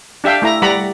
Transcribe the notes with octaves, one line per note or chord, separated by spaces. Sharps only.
D4 G4 E5 F5 G5
A3 E4 A#5
G3 D5 F#5 A#5 B5